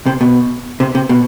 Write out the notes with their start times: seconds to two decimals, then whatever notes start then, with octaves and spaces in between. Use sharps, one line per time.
0.06 C3
0.21 B2
0.80 C3
0.95 C3
1.09 B2